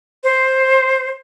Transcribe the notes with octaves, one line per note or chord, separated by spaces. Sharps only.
C5